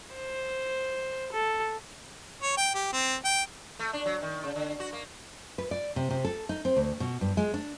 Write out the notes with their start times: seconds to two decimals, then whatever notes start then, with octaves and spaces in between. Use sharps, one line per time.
0.13 C5
1.32 A4
2.43 C#5
2.57 G5
2.75 G4
2.93 C4
3.25 G5
3.79 A3
3.93 D4
4.06 F#3
4.22 D#3
4.44 C#3
4.56 D3
4.80 F#4
4.93 A#3
5.58 B4
5.71 D5
5.96 C3
6.11 C3
6.25 A4
6.49 D#4
6.65 C4
6.77 D2
7.00 B2
7.21 G2
7.37 G#3
7.54 D4